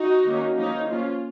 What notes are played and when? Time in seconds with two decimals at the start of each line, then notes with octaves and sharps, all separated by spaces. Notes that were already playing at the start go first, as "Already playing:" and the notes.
Already playing: D#4 F#4
0.25 D#3 A#3 C#4
0.57 F3 A#3 C#4 D#4
0.89 F3 A#3 C#4 F4